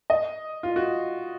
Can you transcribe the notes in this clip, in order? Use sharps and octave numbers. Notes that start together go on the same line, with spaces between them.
D#5
F4
F#4